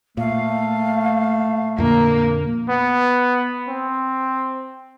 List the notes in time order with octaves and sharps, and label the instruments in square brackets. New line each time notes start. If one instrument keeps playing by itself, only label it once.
[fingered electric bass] A#2 [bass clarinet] A3 [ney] F5
[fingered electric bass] F2 A#2 D3 [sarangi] A#3
[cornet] B3
C4